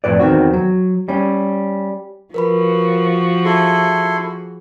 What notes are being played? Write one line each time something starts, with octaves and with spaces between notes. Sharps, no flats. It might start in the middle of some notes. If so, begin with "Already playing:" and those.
F2 A2 B4 D5
E2 D#3 C4 F#4
F#3
G3 C#4
F3 F#4 A#4 B4 B5
E4 G#4 A4 C6